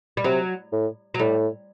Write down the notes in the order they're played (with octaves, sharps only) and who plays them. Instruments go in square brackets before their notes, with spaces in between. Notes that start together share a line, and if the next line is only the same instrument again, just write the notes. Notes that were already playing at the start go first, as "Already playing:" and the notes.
[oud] G3
[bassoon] C3 [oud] F#3
[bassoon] A2
[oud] F#3
[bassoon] A2 [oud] G3